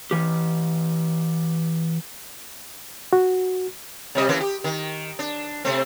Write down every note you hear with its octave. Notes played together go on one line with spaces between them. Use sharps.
E3 G4
F#4
C3 G3 D#5
E3 A#3 C#4
G4
D#3
D4
C3 A3 C4